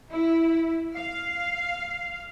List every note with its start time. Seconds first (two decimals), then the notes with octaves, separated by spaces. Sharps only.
0.11 E4
0.96 F5